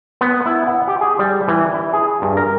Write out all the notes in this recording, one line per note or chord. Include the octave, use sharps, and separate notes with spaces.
B3
E4
F#5
G4
G#4
G3
E3
E4
G#4
G2
A#4